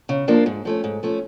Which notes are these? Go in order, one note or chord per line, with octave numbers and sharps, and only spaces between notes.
C#3
F3 A#3 D4 F4
G#2
F3 A3 C#4
G#2
F3 A3 C#4